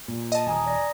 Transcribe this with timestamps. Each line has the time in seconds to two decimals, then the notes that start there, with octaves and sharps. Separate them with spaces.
0.08 A#2
0.32 D#5 A5
0.47 D#1 G#5 A#5 D#6
0.66 D5 A#6